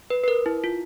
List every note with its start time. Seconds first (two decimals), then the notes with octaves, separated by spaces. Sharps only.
0.10 B4
0.24 B4
0.28 A#4
0.46 E4
0.64 F4